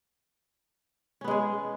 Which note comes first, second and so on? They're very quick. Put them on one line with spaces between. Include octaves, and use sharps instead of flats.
C#4 B3 G#3 G#4